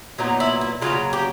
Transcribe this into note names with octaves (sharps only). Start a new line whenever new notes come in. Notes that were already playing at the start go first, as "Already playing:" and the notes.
A#2 F#3 B3 D#4
E4
E4
C#3 F#3 A#3 F4
G4